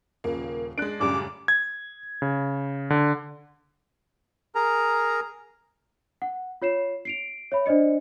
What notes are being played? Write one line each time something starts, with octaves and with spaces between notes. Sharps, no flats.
D#1 C#3 A#3
G#3 D4 F#6 D7
F#2 A2 C#3 G3 D4 D6
G#6
C#3
D3
G#4 A#4 A#5
F#5
F4 C#5 C7 E7
C7 D7 F7
C#5 E5 B5
D4 C5 D5 D#5 C#7